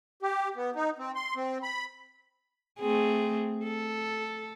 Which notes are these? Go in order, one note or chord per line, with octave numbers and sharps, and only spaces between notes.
G4
B3
D#4
C4
C6
C4
B5
A3 C4 G#4
A4